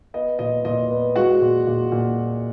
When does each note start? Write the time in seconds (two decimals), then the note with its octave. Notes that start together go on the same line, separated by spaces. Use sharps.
0.14 B3 D#5
0.39 A#2 D#5
0.65 A#2 D#5
0.90 B3
1.16 G#3 F#4 F#5
1.41 A#2
1.67 A#2
1.92 A#2